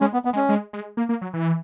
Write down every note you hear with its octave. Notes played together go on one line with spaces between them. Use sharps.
G#3 C#4
B3
B3
G#3
C#4
G#3
G#3
A#3
A#3
F#3
E3